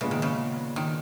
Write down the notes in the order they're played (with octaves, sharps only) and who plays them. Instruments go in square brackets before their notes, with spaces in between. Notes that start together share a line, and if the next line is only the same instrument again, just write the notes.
[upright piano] A#2 G#3 B3 [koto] C#3
[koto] D#3
C#3
D#3